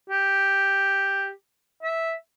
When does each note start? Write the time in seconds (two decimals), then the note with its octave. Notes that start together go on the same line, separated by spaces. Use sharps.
0.10 G4
1.83 E5